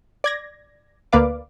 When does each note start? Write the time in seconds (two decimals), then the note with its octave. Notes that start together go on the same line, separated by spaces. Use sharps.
0.24 D5 G#6 A#6
1.12 D2 A#3 B4 D5 F5 D6